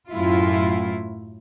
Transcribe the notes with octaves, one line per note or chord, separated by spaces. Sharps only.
F#2 A2 F#3 E4 F4